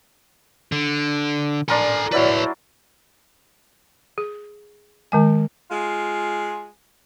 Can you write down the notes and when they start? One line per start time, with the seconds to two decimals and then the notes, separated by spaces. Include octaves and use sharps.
0.72 D3
1.68 D4 A4 A#4 G#5 C6
2.12 F#3 E4 B4 C#5 D5
4.18 G#4
5.12 D#3 G#3 G#5
5.69 G#3 F4